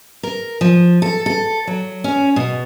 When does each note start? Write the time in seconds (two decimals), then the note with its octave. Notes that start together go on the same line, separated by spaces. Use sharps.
0.23 A#4
0.61 F3
1.02 A4
1.26 A4
1.67 F#3
2.04 C#4
2.36 B2